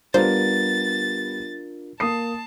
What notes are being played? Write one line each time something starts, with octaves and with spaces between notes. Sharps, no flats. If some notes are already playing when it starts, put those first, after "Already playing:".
G3 B3 D4 F4 A#4 C5 A6
A#3 A5 D#6 C7